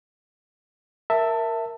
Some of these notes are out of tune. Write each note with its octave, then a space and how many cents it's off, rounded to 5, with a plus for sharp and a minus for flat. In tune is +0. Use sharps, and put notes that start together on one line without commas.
A#4 +0 E5 +0 A5 +20